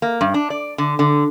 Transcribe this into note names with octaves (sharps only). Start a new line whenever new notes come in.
A#3
G2
D4
D5
D3
D3